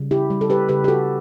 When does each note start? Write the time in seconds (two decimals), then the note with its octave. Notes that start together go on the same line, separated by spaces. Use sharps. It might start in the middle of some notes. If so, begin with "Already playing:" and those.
Already playing: C#3 G3
0.11 E4 G4
0.30 G3
0.41 A4
0.50 G4 B4
0.69 C#3 G4 B4
0.84 G4
0.88 F#4 A4